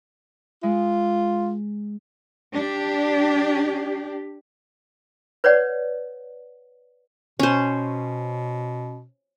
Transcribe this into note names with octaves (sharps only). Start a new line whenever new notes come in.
G#3 F4
D4 G4
B4 C#5 D5 F#5
B2 C#4 C5